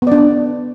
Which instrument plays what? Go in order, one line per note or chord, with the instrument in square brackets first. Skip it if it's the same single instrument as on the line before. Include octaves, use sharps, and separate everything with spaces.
[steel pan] B3
D5
D4